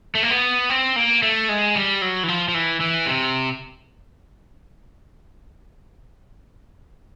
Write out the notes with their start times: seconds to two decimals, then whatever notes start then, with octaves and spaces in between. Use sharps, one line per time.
0.15 A3
0.23 A#3
0.30 B3
0.70 C4
0.96 A#3
1.23 A3
1.49 G#3
1.76 G3
2.02 F#3
2.23 E3
2.28 F3
2.48 F3
2.54 E3
2.81 E3
3.06 C3